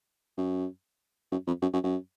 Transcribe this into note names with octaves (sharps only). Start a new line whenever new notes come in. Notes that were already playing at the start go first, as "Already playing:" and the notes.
F#2
F#2
F2
F#2
F#2
F#2